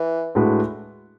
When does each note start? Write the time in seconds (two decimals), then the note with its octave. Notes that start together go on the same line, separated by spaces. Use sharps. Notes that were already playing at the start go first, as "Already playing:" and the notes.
Already playing: E3
0.35 A2 G#3 D4 F#4 B4